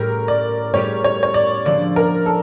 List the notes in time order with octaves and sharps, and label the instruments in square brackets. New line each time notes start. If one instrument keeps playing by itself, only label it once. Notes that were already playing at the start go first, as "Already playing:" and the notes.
Already playing: [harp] A2 G3 C#4 G4 [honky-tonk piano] A#4
[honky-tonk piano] D5
[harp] A2 G3 C#4 G4 [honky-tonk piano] C#5
[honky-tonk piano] C#5
C#5
D5
[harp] D3 F3 A#3 [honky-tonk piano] D5
[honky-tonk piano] A#4
A4